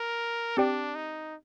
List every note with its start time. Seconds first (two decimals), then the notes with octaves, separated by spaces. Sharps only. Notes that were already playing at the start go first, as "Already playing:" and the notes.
Already playing: A#4
0.57 C4 D4 G4 D5 G5
0.95 D#4